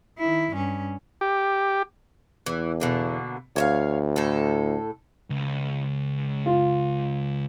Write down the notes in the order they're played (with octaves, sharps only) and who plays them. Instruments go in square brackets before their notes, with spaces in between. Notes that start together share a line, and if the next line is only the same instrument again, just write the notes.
[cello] D#3 E4
G2 C#4
[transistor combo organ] G4
[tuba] E2 [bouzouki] E3
[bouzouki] B2 D3 A#3
[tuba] D2 [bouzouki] C#5 E5 F5
[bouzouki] A2 A4
[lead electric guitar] C#2
[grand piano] F4